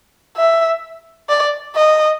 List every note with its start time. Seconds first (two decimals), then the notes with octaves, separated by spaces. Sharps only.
0.37 E5
1.29 D5
1.76 D#5